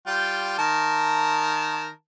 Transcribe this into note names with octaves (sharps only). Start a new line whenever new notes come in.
G3 F4 G5
D#3 A#4 A5